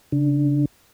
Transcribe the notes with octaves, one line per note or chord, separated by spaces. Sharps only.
C#3 D4